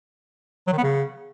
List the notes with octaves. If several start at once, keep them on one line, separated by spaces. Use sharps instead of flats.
F#3
D#3
B3
C#3